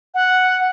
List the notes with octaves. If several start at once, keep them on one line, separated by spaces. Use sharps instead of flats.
F#5